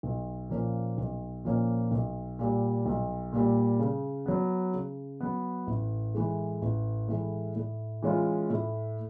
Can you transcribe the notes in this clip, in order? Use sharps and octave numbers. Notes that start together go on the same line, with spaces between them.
B1
A#2 F3 A#3 C#4
B1
A#2 F3 A#3 C#4
B1
A#2 G3
B1
A#2 G3
C#3
F#3 B3
C#3
F#3 B3
A1
A2 E3 G#3
A1
A2 E3 G#3
A2
E3 G#3 C#4 F4
A2